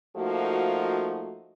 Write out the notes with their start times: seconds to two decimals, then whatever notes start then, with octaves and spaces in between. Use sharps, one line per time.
0.16 F3 A3 A#3 D#4 F#4